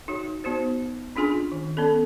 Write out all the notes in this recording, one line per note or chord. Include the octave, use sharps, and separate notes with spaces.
D#4 F#4 C#5
B3 D#4 F#4 C5
C#4 D4 F4 G#4 G#5 C6
D#3
B3 C#4 A4